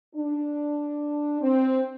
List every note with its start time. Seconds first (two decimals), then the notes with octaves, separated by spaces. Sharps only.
0.16 D4
1.42 C4